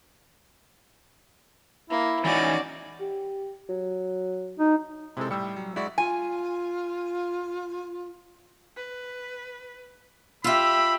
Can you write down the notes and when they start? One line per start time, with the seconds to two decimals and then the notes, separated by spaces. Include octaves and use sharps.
1.90 A#3 E4
2.24 E3 C#4 D#4 F#4 D5
3.00 G4
3.69 F#3
4.59 D#4
5.17 C3 G#3 C4 E4 A4
5.31 A2 G3 E6 C#7
5.56 F#3
5.76 G#3 E4 F#4 D5 F#5
5.98 F4 G#5
8.77 B4
10.44 F4 G4 E5 B5 E6